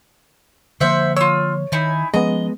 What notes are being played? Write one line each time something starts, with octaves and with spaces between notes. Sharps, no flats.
D3 F3 A#3 C5 E5 F#5
F4 C#5 E6
D#3 D#4 E4 G#5
F3 G#3 B3 C#4 D#5 A#5